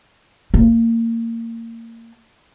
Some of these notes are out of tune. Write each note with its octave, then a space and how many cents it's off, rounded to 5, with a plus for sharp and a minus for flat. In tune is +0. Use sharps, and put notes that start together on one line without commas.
A#3 -30